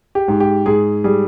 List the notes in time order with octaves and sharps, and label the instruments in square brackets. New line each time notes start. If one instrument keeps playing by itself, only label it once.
[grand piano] G4
G#2
G4
G#2 G#4
G3 G#4